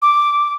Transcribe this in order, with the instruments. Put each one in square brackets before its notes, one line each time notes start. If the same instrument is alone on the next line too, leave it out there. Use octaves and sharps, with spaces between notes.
[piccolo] D6